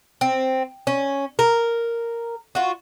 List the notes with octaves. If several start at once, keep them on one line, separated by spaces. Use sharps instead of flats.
C4
C#4
A#4
F4 F#4